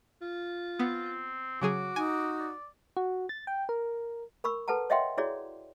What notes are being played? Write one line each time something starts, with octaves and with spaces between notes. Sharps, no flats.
F4
B3 C4
C#3 F#3 F#4 G#4 D6
D#4 G#5
D5
F#4
A6
G5
A#4
A#4 B5 C#6 E6
A4 B4 F#5 A5 A#5
C#5 D#5 E5 F#5 G5 C6
E4 F#4 G#4 C#5 D5